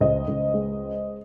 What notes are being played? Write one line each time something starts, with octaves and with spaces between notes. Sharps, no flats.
C#2 C5 D#5
C#2
G#3